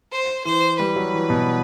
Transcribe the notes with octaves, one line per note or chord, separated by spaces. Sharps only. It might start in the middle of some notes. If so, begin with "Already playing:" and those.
C5
E3 C5
G3 B4
F#3
E3
B2